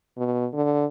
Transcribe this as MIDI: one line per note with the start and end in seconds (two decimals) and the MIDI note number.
0.18 0.47 47
0.53 0.85 50